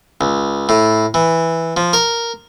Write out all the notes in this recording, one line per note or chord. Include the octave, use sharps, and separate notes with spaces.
C#2
A2
E3
F3
A#4